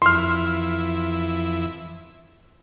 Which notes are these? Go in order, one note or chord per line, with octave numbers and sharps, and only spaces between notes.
F2 E3 E4 C6 F6